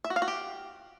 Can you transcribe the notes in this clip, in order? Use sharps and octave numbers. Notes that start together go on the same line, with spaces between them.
E5
F#4
F5
F#4
G4